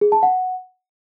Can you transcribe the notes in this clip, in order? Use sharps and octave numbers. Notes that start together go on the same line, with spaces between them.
G#4
A5
F#5